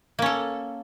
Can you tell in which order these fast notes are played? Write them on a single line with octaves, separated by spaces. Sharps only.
A#3 C#4 A4